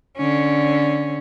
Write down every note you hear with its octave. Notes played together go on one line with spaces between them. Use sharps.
D3 C#4